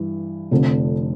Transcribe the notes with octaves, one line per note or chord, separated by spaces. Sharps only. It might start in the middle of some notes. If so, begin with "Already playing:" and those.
Already playing: G2 E3
F1 F2 D3